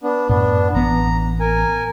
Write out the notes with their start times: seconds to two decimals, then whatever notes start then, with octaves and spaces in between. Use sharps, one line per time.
0.03 B3 D4
0.29 F#2 A2 B3 D4
0.75 A1 B3 A#5
1.40 A#4 G#5